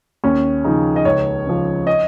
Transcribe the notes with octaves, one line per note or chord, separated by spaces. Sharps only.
D#2 C#4
C#3 F3 D#4
D#5
C#2 C#5
C#3 F3
D#5